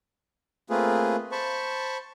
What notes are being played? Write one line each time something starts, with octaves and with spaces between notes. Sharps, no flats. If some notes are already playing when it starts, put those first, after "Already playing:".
A3 A#3 C4 F4 G#4 B4
C5 A5 B5 C#6